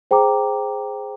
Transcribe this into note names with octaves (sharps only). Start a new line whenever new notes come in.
G#4 C5 G5 A#5 D6